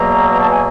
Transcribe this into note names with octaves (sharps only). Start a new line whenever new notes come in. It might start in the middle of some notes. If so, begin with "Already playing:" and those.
Already playing: E2 B2 F#3 A#3 A#5
A#5
A5
G#5